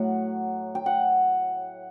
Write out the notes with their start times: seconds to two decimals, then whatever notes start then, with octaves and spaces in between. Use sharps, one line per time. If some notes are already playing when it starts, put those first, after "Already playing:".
Already playing: A2 F#3 F#5
0.75 G5
0.86 F#5